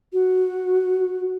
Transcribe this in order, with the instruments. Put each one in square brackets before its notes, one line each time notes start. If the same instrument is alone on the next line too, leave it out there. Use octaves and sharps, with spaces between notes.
[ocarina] F#4